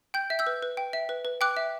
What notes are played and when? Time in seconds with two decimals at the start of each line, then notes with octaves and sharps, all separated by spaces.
0.14 G5 G6
0.30 E5
0.39 E6 G6
0.47 B4
0.63 B4
0.77 G5
0.93 E5
1.09 B4
1.25 B4
1.41 G5 D6 F#6
1.57 E5